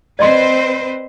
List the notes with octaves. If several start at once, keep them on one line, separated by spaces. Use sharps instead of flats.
C4 B4 C5 D5 D#5 C6